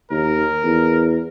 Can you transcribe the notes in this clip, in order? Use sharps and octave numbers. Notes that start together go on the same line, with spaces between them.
D#2 A#4
E2